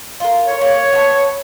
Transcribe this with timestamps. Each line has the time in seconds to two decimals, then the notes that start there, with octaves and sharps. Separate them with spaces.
0.20 F4 A#4
0.47 C#5
0.61 A#3
0.93 B3 A5